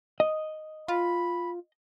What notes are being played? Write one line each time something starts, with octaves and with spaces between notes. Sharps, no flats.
D#5
F4 B5